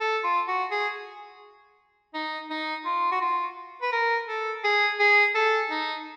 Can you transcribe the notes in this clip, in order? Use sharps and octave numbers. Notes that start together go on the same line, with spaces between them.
A4
F4
F#4
G#4
D#4
D#4
F4
F#4
F4
B4
A#4
A4
G#4
G#4
A4
D#4